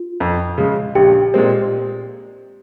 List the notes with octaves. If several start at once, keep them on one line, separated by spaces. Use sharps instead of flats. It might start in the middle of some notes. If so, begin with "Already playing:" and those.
Already playing: F4
F2
C#3 G#3
A#1 G4
A#2 G#3 C4